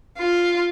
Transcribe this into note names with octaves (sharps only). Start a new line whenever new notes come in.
F4